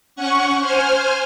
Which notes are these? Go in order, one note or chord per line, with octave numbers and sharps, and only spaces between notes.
C#4 F#5 C#6
C5 G#5 F6